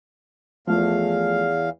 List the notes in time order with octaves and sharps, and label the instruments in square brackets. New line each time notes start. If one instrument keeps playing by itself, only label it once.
[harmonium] E2 F5 [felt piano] F3 A3